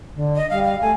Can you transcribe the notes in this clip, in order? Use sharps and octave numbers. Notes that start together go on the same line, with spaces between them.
D3
D#5
G3 F5
F5
A3 G#5